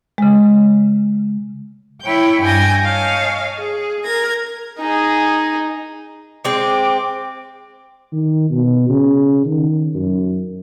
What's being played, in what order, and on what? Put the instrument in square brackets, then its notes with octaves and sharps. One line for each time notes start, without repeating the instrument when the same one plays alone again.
[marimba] C#3 G#3
[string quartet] E4 C#5 G5
G2 G5 G#5 G6 G#6 A#6
C#5 D#5 F5 G#5 A5
G#4
A#4 G#6 A#6
[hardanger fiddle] D#4 G#4
[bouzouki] G#3 C4 [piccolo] D6
[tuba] D#3
B2
C#3
D#3
F#2